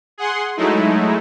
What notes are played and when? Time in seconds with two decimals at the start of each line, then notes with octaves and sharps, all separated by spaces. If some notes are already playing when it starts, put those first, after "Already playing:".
0.18 G#4 F#5 C6
0.57 F#3 G#3 A3 D#4 E4